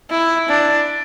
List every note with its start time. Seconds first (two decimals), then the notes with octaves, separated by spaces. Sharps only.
0.10 E4
0.49 D4